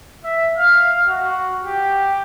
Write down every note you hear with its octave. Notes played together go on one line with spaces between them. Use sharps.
E5
F5
F#4
G4